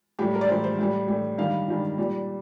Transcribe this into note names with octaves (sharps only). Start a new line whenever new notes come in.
A2 G3 G4
A#4
D5
A2 G3 C5
C5
A2 G3
A2 G3
G2 D#3 G3 F5
G2 D#3 G3
A#2 G3